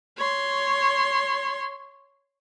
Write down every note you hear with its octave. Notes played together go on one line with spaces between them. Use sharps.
C#5 C6